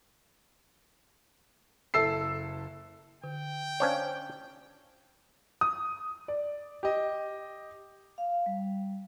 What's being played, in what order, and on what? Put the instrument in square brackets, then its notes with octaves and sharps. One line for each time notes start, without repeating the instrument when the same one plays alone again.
[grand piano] F#1 E4 A4 E6 C7
[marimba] D3 [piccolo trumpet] G5
[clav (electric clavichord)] C#4 D4 C#5 [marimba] C5 F5
[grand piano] D#6
D5
G4 D#5
[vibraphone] F5
G3